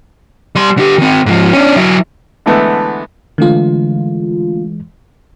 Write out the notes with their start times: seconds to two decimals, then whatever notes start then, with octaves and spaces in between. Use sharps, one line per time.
0.56 G3 C6
0.77 D3 G4
0.98 D#3 C4
1.26 G#2 F3
1.53 C#4 D4
1.76 F#3 E4
2.46 D3 E3 G#3 A3 B3
3.38 D3 E3 G#3 A3 F4